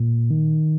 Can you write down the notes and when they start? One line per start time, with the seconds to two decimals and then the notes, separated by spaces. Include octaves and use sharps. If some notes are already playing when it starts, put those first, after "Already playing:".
Already playing: A#2
0.30 D#3